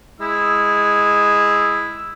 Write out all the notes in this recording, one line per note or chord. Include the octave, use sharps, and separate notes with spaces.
G#3 E4 E6